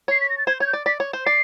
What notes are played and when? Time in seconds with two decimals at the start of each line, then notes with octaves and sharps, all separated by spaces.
0.08 C#5 C7
0.21 B6
0.30 A#6
0.38 A6
0.47 C5 G#6
0.60 C#5 G#6
0.67 G6
0.73 D5
0.86 D5 B6
1.00 C#5
1.13 C5
1.26 D5 C7